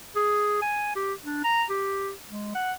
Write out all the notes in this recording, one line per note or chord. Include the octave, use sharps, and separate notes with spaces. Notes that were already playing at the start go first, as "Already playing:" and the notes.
G#4
G#5
G4
D4
A#5
G4
G#3
F#5